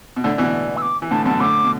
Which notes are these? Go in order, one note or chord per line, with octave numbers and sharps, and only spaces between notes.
B2
A2 D3 D5
B2 E3
E6
D6
E3
A2 D3 A5
F#2 B2 A5
A2 D3 D6
B2